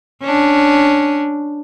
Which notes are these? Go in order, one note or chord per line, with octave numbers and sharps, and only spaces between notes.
C#4 D4